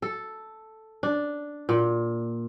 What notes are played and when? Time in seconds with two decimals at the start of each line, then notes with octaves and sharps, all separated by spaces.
0.02 A4
1.03 D4
1.69 A#2